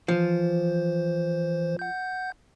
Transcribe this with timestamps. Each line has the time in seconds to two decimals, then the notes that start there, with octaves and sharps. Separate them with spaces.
0.08 E3 F3 C5
1.79 F#5 G6